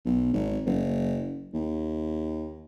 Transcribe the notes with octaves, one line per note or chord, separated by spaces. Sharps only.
B1
G#1
F#1
D#2